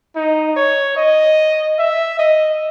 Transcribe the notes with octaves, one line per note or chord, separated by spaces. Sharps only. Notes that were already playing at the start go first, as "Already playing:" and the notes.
D#4
C#5
D#5
E5
D#5